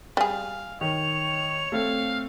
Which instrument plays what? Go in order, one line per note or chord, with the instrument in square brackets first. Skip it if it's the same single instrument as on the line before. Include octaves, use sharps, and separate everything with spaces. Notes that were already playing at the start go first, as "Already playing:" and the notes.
[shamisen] G3 G#4 [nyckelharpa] F5
[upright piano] D#3 [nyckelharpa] C#5 [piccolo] F7
[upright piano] A3 C4 [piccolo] F5